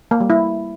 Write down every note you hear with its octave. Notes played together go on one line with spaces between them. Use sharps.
A#3
G3
E4